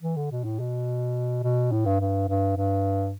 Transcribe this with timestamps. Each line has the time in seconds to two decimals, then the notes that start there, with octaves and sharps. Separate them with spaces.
0.02 E3
0.17 D3
0.31 B2
0.44 A2
0.60 B2
1.43 B2
1.72 A2
1.86 G2
2.00 G2
2.29 G2
2.57 G2